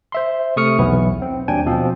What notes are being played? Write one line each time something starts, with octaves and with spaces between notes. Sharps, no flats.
C5 E5 C6
C3 A3 C#6 D#6 F6 C#7
B1 E2 E3 F#3 B3 E4
C4
D#2 F#3 D4 G5 G#5
B2 F3 C4